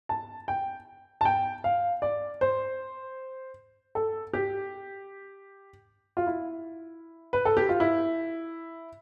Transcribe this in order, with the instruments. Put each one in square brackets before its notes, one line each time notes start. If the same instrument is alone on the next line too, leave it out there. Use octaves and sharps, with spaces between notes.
[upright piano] A5
G5
A5
G5
F5
D5
C5
A4
G4
F4
E4
B4
A4
G4
F4
E4